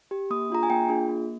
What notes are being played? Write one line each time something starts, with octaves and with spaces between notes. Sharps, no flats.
G4
A#3 D#6
D4 F4 G#4 A#5
G#5
A#3 G5
D4 F4 G#4
A#3